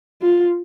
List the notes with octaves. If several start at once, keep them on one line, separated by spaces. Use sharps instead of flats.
F4